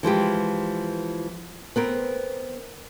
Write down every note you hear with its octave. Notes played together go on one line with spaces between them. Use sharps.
E3 F3 G#3 G4
B3 C4 A#4